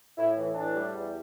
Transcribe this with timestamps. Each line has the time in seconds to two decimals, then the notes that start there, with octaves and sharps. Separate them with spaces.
0.17 A2 E4
0.37 E3
0.55 A2 D4
0.75 G3
0.93 E2